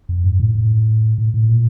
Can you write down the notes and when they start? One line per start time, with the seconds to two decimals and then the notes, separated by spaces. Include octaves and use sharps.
0.09 F2
0.24 G2
0.40 A2
0.55 A2
1.18 A2
1.34 A2
1.49 A#2